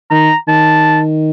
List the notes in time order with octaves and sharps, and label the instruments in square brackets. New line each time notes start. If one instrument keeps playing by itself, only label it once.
[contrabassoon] D#3 [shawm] A#5
[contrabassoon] D#3 [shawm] A5